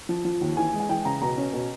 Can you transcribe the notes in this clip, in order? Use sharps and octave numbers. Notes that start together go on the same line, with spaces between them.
F3
F3
D#2
E3 G#5
G#3
G#5
E3 G5
C#3 A#5
B2 A#5
C#4
B2